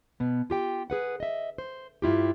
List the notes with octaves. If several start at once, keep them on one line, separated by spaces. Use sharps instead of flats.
B2 B3
F4 G4 G5
G#4 B4 F#5
D#5 E5
C5
G2 E4 F4 G4